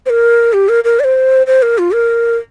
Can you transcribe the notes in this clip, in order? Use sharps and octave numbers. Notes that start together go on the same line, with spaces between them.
C5
A#4
G4
A#4
A#4
D5
C5
C5
A#4
F4
A#4